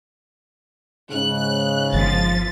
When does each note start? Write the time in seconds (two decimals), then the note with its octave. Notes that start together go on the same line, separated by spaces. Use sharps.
1.11 G#2 C#3 F#6
1.93 G1 D#3 F3 A6